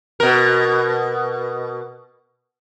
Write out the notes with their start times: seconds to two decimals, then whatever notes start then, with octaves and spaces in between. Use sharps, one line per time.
0.20 B2 A#4